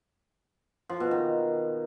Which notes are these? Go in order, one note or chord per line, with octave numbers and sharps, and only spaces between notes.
F3
B2
D#3